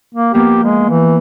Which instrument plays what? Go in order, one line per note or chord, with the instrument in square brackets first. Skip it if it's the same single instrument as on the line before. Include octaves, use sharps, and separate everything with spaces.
[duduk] A#3
[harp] F3 A#3 B3 [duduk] G4
[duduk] G#3
E3